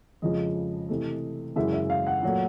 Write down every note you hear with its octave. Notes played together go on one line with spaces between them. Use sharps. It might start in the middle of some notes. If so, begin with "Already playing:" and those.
F2 C#3 F3 G#3 D#5
C3 E3 A3
F#2 C#3 E3 G#3 E5
E5
F5
F#5
A#2 F#3 A3